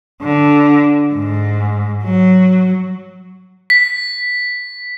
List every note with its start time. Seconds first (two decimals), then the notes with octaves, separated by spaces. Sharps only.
0.22 D3
1.14 G#2
2.04 F#3
3.70 B6